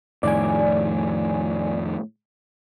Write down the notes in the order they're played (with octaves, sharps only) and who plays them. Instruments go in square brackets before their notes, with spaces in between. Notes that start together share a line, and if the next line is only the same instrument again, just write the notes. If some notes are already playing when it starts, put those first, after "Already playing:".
[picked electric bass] F2 A2 D#3 [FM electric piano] D5 G#5